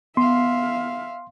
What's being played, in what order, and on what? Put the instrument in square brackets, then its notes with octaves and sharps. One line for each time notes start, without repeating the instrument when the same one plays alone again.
[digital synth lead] B3 [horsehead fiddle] E5 F5 [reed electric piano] C6